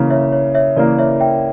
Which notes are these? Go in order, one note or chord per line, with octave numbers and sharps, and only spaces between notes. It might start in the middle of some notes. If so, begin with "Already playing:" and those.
Already playing: C#3 E3 A#3
C#5 E5
C#5
C#5 E5
C#3 E3 A#3 A#4 D5
C#5 E5
E5 G5